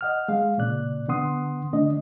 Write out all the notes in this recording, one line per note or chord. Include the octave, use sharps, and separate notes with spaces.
D#5 F#5 F6
G#3 F5
A#2 C#3 D5 F#6
D3 B3 F#5 C6 D#6
D3 A3 D4 D#5